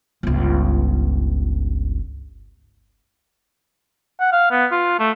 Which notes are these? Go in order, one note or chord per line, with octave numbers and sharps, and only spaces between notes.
G1 C#2
F#5
F5
B3
F4
A3